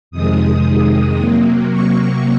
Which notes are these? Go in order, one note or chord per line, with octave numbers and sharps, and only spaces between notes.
F2 C3 D#3 G#3 D#6
C3 F#3 A#3
C#6